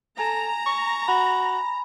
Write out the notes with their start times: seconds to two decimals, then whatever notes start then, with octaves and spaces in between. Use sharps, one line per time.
0.19 A4 G#5 A#5 G#6 E7
0.66 C#6
1.08 F#4 B5